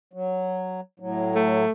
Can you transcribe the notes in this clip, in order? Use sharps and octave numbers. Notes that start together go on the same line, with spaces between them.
F#3
A2 F#3
A3